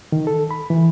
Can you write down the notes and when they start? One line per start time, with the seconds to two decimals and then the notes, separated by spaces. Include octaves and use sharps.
0.12 D#3
0.27 A4
0.51 B5
0.70 E3